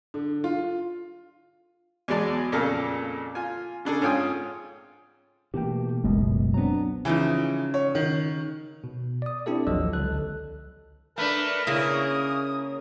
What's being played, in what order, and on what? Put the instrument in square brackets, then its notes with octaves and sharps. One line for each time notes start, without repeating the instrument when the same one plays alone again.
[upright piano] D3
F4
[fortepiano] E2 F#3 G#3 D5 A5
F2 A#2 C#3 A#3 A4 F5
F4 G#5
C#3 D4 G#4 A4
G#2 C#4 F4 G5 G#5 D#6
[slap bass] B2 [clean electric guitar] E3 A3 A#3 [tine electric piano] G4 G5
[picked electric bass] F#1 F#2 B2 [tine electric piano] C#2 [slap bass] G#3
[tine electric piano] F#3 C4 D4 [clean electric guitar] B3 A#5
[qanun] C#3 F3 D#4 [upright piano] E3
[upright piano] C#5
D#3
[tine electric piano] B2
D5 D#6
C4 D4 E4 G4 A4 D5
A1 D#2 F3 F#3 D#5 E6
C#2 D3 A4 F#6
[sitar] A3 D4 [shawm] A#4 [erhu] B4
[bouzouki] C#3 A#3 C#4 [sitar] E4 [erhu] D#6